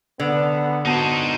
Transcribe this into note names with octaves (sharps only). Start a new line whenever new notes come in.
D3 B3
B3 D#4 F#4 C5 A5